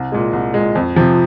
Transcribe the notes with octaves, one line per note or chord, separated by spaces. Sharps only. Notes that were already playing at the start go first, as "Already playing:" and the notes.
Already playing: C2
A#2 G#3
C2
A#2 G#3
F2
C3 F3